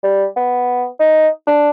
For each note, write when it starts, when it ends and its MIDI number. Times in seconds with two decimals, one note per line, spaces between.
0.03 0.26 55
0.36 0.85 59
0.99 1.28 63
1.47 1.70 62